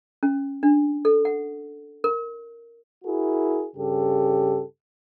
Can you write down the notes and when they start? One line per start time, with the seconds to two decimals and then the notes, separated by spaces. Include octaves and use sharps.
0.23 C#4
0.63 D4
1.05 A4
1.25 F#5
2.04 A#4
3.05 E4 F#4 G#4 A#4
3.76 G2 C#3 G4 A4